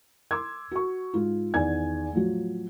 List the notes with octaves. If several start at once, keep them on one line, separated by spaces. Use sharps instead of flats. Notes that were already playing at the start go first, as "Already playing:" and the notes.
C6 D6 E6 G#6
F#4 C#6
G#2 F4
E2 D#3 D5 G#5 G#6
A2 F3 F#3